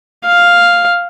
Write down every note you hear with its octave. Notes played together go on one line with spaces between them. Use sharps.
F5